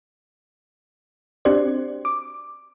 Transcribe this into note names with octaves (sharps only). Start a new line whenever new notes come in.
C4 D4 F#4 G4 C5 D5
D6